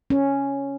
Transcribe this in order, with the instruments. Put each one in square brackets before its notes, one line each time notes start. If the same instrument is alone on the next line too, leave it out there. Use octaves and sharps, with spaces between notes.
[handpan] C#4